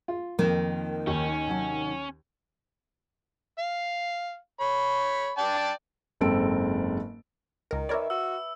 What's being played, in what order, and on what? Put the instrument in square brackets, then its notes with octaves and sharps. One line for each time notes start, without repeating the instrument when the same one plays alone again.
[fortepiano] F4
[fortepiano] F2 [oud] D#3 [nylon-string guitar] F3 A#3
[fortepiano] D#2 [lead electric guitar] C#4
[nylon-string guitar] C3 F#3 A5
[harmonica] F5
C#5 B5
D5 G5 A5
[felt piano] F#1 G#2 C4 A4 D7
[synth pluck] C#2 A#4 [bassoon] D#3
[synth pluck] A#4 C#5 D5 [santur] B4 E5
[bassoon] F#4 [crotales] E6